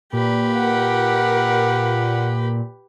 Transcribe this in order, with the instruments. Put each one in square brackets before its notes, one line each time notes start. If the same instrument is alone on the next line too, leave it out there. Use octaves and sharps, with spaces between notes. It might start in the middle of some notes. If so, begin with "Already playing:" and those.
[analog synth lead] A#2 [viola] G4 B4
[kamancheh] A#4 F#5